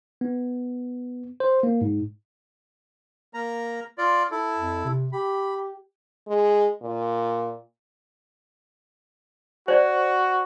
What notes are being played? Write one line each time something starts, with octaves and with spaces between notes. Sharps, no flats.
B3
C5
A#3
G#2
A#3 A#5
F4 D5
E4 A4
F2
C3
G4 B5
G#3
A#2
F#4 C5 D5